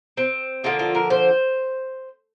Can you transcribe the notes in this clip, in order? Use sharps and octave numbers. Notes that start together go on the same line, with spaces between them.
C4
D3 F3 A#3 F4
F4
A#4
C5